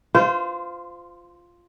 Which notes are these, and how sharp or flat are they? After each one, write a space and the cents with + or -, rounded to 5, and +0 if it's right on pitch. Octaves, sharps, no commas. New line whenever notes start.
F4 +0 C5 -25